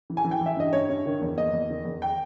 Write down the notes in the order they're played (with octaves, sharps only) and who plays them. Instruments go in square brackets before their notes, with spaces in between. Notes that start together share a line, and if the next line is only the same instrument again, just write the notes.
[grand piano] E3
G#5
E3
G5
E3 E5
G2 D#5
G2 C#5
G2
D#3
E2
A#3 D#5
E2
D#3
E2
G5